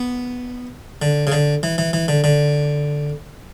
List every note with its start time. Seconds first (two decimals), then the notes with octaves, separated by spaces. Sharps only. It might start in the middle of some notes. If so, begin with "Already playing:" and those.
Already playing: B3
1.02 D3
1.27 C#3
1.32 D3
1.63 E3
1.78 E3
1.93 E3
2.08 D3
2.24 D3